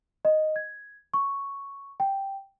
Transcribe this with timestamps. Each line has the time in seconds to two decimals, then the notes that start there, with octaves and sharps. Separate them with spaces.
0.25 D#5
0.56 G#6
1.14 C#6
2.00 G5